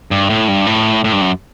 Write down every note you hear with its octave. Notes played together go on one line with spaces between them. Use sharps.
G2
A2
G2
A2
A2
G2
F#2